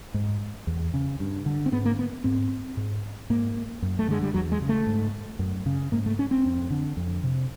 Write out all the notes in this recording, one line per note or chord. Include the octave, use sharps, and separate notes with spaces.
G#2
E2
C#3
G2
D3
C4
G#2 B3
A#3
B3
G#2 C4
G#2
G#2 A#3
F#2
A3
D3 G#3
G3
E2 F#3
G#3
C#3
A3
G#2
F#2
C#3
G#2 A#3
A3
C#4
C4
F2
D3
F2
C3